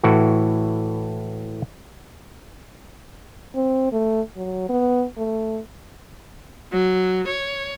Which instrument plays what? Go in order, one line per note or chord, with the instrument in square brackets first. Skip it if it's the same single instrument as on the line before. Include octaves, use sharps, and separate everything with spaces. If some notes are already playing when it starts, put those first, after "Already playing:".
[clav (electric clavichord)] A2 E3 F#4
[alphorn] C4
A3
F#3
B3
A3
[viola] F#3
C#5